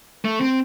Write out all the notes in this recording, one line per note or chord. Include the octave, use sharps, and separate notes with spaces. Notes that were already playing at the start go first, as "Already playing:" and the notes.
A3
C4